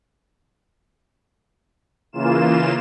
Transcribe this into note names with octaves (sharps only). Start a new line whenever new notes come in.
C#3 E3 A#3 F4 E7